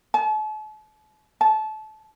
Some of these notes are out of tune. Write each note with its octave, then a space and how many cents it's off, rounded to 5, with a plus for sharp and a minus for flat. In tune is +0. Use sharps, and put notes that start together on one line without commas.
A5 -40
A5 -25